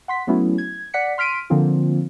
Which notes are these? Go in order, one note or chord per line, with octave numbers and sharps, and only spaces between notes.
F#5 C6 B6
F#3 A3 B3 C#4 E4 F#4
G#6
D5 F#5 B6 C#7
C6 F6 B6 D7 D#7
D3 F3 A#3 C4 F4